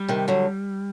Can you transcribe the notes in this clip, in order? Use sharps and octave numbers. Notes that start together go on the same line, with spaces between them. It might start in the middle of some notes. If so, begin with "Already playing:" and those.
Already playing: G3
C3 D#3
D3 F#3